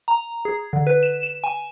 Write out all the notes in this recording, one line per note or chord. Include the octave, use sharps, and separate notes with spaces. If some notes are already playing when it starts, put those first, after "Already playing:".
A#5
G#4
D3
B4
E7
E7
G#5